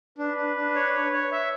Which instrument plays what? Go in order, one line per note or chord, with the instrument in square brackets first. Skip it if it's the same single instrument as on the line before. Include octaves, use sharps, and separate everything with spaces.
[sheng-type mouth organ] D4 [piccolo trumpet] B4
[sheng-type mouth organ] D4
D4
C#5
C#5
C#5
E5